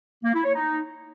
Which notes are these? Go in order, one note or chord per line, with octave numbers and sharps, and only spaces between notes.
A#3
E4
C#5
D#4